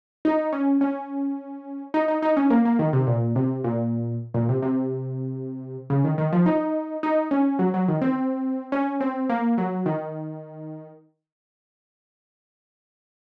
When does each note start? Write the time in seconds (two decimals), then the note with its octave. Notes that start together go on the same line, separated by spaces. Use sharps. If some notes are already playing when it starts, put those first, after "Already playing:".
0.25 D#4
0.53 C#4
0.81 C#4
1.94 D#4
2.08 D#4
2.22 D#4
2.37 C#4
2.50 A#3
2.65 A#3
2.79 D#3
2.93 C3
3.07 A#2
3.36 C3
3.64 A#2
4.34 A#2
4.49 C3
4.62 C3
5.90 C#3
6.04 D#3
6.18 D#3
6.33 F3
6.46 D#4
7.03 D#4
7.31 C#4
7.59 F#3
7.74 F#3
7.88 D#3
8.01 C4
8.72 C#4
9.00 C4
9.29 A#3
9.58 F#3
9.86 D#3